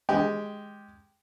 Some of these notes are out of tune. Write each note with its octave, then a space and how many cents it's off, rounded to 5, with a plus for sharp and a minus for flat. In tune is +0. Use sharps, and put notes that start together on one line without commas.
G#3 +0 G4 +0